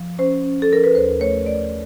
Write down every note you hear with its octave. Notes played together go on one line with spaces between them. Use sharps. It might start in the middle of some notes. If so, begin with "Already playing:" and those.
Already playing: F3
C#4 C5
C#4
A4
F3 A#4
B4
D#2 C5
A3 C#5
A3 D5